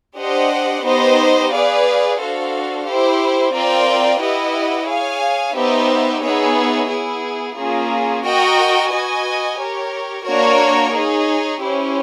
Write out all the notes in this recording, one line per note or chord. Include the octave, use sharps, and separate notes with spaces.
D4 G4 C5 D#5 F#5
B3 D#4 G4 C5 D#5
G#4 B4 D5 F5
D4 F#4 A4 C5 F5
E4 G4 C5
C4 F4 A#4 D5 G5
E4 G4 B4 D#5 F#5
G#4 C#5 F5 G#5
B3 D#4 G4 C5 E5
B3 D#4 G#4 C#5 E5
B3 E4 G#4
A#3 C#4 F4 G#4
F#4 A#4 D#5 G5
F#4 B4 D#5 G#5
G4 A#4 C#5
A#3 D4 F#4 A#4 C#5
D#4 G#4 C#5
C#4 E4 G4 C5